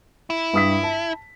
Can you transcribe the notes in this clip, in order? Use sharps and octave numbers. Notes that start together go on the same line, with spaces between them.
E4
G2 D#6 B6
A5